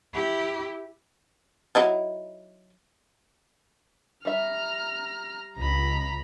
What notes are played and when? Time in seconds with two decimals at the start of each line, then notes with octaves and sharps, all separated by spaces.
0.13 E4 G4
1.75 F#3 D#4 E4
4.25 G3 E5 A#5 F6
5.57 C#2 A#5 B5